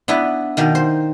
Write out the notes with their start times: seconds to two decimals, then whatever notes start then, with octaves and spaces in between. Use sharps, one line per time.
0.08 B3 D4 E4 B4
0.57 B2 D#3 A#3
0.75 C5